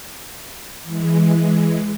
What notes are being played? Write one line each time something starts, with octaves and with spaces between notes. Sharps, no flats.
E3 G#3